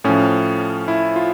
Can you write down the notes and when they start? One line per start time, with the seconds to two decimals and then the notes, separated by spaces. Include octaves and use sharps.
0.04 A2 F3 C#4
0.88 E4
1.16 F4